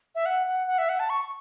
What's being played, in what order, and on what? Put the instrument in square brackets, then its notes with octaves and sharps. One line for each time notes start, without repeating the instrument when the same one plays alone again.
[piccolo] E5
F#5
F#5
F#5
E5
F#5
A5
C#6